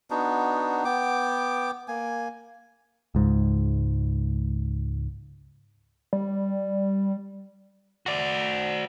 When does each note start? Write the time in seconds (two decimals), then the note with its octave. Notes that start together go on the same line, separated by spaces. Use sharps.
0.10 B3 D4 D#4 F#4
0.85 B3 G5 D6
1.88 A#3 G#5
3.15 C#2 G#2
6.13 G3
8.06 F#4 D5